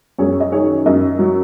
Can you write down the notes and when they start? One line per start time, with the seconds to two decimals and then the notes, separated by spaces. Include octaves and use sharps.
0.18 F#2 G#4 C#5
0.40 D#5
0.52 D#3 G#4 C#5
0.86 F#2 A#4 D#5
1.19 F#3